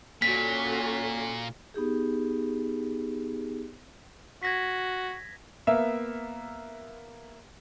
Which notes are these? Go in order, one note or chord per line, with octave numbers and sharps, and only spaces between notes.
A#2 C#4 F#4 A4 B6
B3 D#4 G4 G#4
F#4 G#6 A#6 B6
A#3 B3 E5 F5